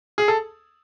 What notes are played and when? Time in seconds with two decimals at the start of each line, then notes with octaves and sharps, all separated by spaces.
0.18 G#4
0.28 A4